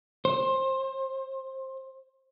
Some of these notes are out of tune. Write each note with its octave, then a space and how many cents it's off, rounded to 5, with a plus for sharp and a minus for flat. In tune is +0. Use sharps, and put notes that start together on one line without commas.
C5 +20